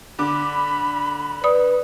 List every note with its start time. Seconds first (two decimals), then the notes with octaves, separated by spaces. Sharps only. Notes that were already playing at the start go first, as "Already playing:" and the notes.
0.19 D3 B5 D6
1.44 B4 D5 D#6